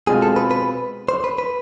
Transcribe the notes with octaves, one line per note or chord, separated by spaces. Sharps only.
B2 G#3 C4 F4 G#4
A4
B4
B4
C5
B4
B4